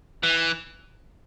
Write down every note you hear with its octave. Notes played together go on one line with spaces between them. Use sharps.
E3